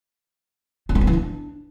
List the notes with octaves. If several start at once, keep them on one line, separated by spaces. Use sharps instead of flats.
B3
A#3
B3
E3
D4